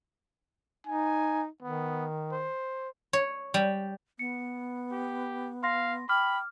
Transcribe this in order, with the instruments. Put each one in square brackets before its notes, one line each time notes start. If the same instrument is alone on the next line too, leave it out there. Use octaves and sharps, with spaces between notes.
[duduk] D#4 [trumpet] G#5
[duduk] D#3 [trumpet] B3
[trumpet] C5
[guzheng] C#5
G3
[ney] B3 [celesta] C#7
[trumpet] G4
[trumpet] F5 [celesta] C6 A#6
[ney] G5 [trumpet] B5 [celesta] D6 F6